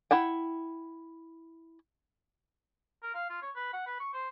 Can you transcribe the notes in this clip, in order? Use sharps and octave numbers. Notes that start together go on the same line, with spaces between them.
E4 F#5 G5
A#4
F5
F4
C#5
B4
F#5
B4
C#6
C5